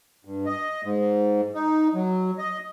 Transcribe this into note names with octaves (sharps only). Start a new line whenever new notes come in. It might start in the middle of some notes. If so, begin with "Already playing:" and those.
G2
D#5
G#2
D#4
F#3
D#5